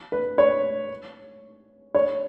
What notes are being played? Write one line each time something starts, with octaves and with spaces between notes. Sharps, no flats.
B4
C#5
C#5